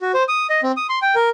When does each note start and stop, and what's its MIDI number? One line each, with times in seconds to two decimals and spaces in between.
0.01 0.12 66
0.14 0.23 72
0.28 0.47 87
0.50 0.61 75
0.63 0.72 60
0.77 0.87 87
0.89 0.99 84
1.02 1.15 79
1.15 1.29 70